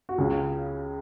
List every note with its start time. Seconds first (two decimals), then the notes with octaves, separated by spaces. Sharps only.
0.09 F#4
0.18 C#2 C#3 G#4